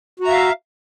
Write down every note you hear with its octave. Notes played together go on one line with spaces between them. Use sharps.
F#4 E5 F5 A#5